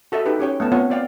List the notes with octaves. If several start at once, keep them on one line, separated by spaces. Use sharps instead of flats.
F#4 A4 D#5 E5
D#4 G4 A4 B4
C#4 G4 C#5 G5
A3 B3 A5
B3 C4 F4 C#5 F#5
C4 C5 D5 F5 G5